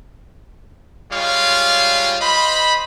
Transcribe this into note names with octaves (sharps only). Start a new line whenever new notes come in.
G3 G#3 F4 C#5 F5
C5 D#5 B5